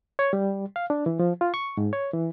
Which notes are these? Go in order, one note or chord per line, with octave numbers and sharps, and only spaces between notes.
C#5
G3
F5
D4
E3
F3
F4
C#6
G#2
C#5
E3